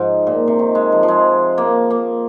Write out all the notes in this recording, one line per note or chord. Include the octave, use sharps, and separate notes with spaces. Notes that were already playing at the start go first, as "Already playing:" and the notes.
Already playing: G#2 F3
A#2
C3
D#3
G#3
F3
F3
G#3
A#3
A#3